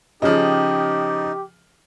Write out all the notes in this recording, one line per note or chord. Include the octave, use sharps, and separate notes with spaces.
C#3 F3 D#4 G4 G#4 D#5